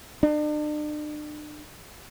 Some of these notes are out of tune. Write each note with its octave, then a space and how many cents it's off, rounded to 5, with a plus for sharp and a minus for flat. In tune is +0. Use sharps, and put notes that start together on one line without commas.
D4 +40